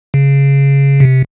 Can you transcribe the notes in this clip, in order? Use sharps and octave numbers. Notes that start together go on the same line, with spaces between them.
C#3
C3